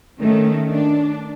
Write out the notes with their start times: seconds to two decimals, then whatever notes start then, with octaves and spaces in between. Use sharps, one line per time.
0.20 D#3 A3 C#4
0.70 D4